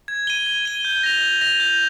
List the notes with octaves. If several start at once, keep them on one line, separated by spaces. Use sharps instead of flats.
G#6
D#7 G7
G#6
D#7 G7
G6
A#6 F7
G6
A#6 F7
G6